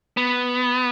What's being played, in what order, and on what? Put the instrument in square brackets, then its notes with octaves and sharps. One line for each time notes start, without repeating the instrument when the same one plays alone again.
[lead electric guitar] B3